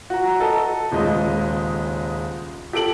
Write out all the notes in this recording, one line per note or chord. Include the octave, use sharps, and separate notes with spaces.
F#4 A#5
A4 D#5
D#1 C#3 G#3 D#5
G4 A4 D7 F#7